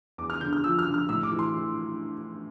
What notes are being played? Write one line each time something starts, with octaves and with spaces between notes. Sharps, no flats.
E2 D6
F6
D3 G6
F6
F3 E6
F6
D3
F6
A2 E6
D6
E3
C6
E3